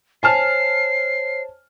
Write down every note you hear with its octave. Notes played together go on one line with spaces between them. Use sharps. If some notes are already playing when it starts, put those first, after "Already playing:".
C5 C#5 G#5 A5 F6 C7